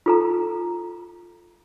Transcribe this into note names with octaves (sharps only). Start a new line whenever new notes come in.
F4 A4 A#5